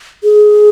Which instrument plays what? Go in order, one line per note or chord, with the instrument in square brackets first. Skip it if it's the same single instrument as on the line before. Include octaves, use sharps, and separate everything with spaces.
[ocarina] G#4